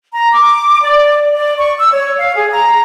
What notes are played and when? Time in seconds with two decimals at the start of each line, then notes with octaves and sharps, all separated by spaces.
0.13 A#5
0.32 D6
0.83 D5
1.35 D5
1.58 C#6
1.79 E6
1.92 C#5
2.19 F5
2.36 G#4
2.51 A#5